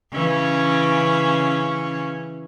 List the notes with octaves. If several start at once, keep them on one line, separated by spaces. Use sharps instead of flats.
C#3 E3 C#4